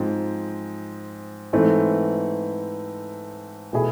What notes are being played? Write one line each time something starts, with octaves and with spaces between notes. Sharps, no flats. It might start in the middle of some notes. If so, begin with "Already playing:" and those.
Already playing: G#2 F3 C4 G#4
G#2 E3 A3 C4
B2 A3 E4 G#4